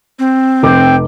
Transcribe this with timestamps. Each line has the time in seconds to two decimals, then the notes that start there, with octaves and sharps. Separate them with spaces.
0.19 C4
0.63 F1 G5 D6